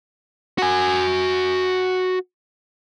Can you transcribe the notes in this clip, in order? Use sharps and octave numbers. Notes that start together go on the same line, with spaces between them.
F#4 G#5